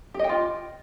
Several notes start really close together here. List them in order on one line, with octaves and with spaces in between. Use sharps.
G4 D#5 G5 F4